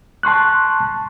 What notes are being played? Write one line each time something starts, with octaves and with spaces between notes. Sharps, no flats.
A5 C6 C#6 F#6